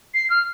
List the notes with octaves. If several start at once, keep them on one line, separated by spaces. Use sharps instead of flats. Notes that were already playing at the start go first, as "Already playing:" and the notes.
C7
F6